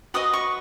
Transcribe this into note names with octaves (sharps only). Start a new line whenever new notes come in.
F#4 B4 D#5 D#6
C#6